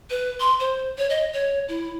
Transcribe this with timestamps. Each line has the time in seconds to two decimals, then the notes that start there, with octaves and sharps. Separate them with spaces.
0.10 B4
0.40 C6
0.60 C5
0.98 C#5
1.10 D#5
1.33 C#5
1.68 E4